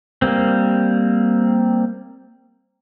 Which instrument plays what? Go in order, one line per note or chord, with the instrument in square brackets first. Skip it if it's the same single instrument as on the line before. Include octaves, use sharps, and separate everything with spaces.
[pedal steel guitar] G3 A#3 C4